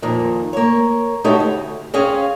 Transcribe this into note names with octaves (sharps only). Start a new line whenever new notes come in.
F2 A#2 D#3
A#3 C#5
A3 D#4 E4 F#4 G4 C#5
D2
C4 C#4 G#4 C#5 F5